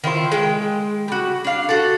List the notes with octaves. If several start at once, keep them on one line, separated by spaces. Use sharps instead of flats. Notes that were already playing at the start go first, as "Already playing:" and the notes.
D#3 E4 F4 C5
G#3 G5
G3 F#4
D4 F5
F#4 A4